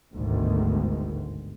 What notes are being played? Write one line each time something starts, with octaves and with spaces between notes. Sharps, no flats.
G1 D2 G#2 B2 D#3 G#3